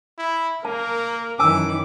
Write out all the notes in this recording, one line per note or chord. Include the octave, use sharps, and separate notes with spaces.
E4
A#3 A#4 A5
F#2 D#3 E3 G#5 A5 D6 E6